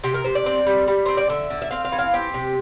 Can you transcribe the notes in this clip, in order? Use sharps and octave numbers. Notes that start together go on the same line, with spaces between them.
C3 G4
A#4
C3 C5
D5
C4
G3
G3
C4 C5
D5
D3 E5
D3
E5
C4 F5
F5
E3
F5
C4 G4
C3